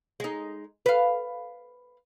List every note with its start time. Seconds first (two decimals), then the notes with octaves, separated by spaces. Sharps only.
0.20 G#3 D#4
0.86 B4 F5